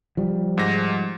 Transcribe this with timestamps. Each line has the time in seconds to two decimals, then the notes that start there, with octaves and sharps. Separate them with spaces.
0.17 F3 G3
0.58 G#2 A#6